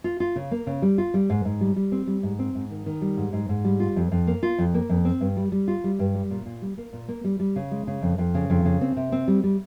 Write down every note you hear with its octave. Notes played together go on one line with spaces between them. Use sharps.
F4
F4
C#3
A#3
C#3
G3
F4
G3
G#2
G#2
G3
G3
C4
G3
G#2
C4
G#2
D#3
D#3
G3
G#2
G#2
G#2
G3
F4
F2
F2
A#3
F4
F2
A#3
F2
C4
G2
G3
G3
F4
G3
G2
G3
A#2
A#2
G3
A#3
A#2
A#3
G3
G3
C#3
G#3
C#3
F2
F2
C#3
F2
C#3
C4
C3
C4
G3
G3